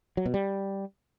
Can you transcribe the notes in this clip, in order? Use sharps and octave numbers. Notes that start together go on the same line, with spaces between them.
F#3
B2
G3